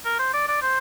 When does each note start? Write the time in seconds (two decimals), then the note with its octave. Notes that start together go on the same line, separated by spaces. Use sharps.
0.05 A#4
0.19 C5
0.33 D5
0.48 D5
0.62 C5